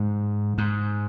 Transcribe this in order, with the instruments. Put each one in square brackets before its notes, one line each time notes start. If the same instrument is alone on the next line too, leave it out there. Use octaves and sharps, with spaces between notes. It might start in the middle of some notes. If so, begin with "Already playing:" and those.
Already playing: [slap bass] G#2
G#2